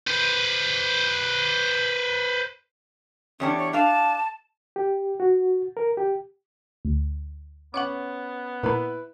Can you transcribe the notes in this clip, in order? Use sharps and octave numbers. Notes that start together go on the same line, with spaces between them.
B4 C5
E2 G3 C#4 D4
C#5
D4 F5 A5
G4
F#4
A#4
G4
D2
B3 C#4 F#5 C#6 D6
A#2 A#3 E4 B4 B5